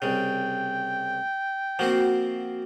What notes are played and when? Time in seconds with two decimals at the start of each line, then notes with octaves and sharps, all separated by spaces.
0.02 C2 C#3 G5
1.79 F3 A#3 C4 F#4